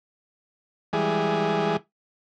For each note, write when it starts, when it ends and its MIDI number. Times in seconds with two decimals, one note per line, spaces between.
0.93 1.77 52
0.93 1.77 55
0.93 1.77 56
0.93 1.77 68